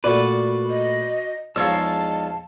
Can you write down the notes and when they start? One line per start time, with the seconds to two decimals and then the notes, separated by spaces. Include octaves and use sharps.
0.04 A#2 A3 F#4 B4 D5
0.70 D#5
1.56 E2 F3 G#3 D#4 C#5 F5 A5 E6